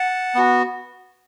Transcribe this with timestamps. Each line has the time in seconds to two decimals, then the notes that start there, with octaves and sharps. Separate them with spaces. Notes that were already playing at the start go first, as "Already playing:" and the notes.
Already playing: F#5 A5
0.35 B3 F#4